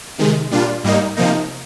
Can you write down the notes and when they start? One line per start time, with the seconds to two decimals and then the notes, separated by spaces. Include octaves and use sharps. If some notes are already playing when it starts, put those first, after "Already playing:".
0.18 C3 D#3 G#3
0.51 A#2 G3 D4 F4
0.84 G#2 G3 A#3 D#4
1.16 C3 F3 A#3 D#4